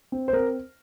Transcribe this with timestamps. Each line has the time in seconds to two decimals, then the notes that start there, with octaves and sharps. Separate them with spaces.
0.12 C4
0.28 C5
0.33 C4 A#4